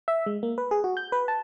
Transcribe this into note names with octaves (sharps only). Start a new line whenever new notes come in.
E5
G#3
A#3
B4
G#4
F#4
G6
B4
A5